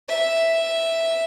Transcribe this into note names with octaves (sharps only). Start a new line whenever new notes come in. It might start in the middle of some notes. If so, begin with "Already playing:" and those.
E5